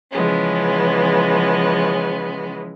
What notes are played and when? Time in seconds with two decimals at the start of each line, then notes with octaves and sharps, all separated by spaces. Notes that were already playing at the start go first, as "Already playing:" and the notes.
0.12 C#3 E3 F3 G#3 B3 C#4